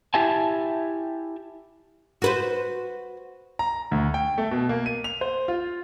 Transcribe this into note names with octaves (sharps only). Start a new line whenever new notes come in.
E4 G4 E5 G#5 A5
F#4 B4 C5
A#5
D2
G5
A3
B2
A#3
D#7
F7
C5
F4